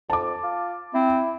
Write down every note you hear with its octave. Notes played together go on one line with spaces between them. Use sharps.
F2 A5 D6
F4
C4 E4